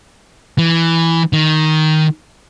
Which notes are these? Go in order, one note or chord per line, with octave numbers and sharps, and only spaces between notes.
E3
D#3